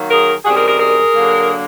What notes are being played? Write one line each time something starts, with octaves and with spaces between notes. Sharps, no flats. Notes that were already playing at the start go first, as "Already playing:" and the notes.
Already playing: D#3 F#3 A#3
G#4 A#4
F#2 D#3 G3 C4 F#4 G#4
G#4 A#4
G#4 A#4
G#4 A#4
D3 F#3 A#3 D4